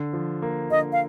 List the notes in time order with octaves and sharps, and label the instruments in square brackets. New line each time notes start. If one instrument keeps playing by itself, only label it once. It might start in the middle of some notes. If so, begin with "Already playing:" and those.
Already playing: [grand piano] D3
F3
A#3
[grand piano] D3 [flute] D#5
[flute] F5